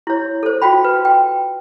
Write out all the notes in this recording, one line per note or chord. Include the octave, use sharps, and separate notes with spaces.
E4 C#5
A4 C5
F4 F#4 G5 B5
B4
G5